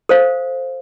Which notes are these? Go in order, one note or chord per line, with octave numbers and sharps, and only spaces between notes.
A4 C5 F5